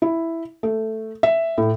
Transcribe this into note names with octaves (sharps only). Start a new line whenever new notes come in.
E4
A3
E5
A2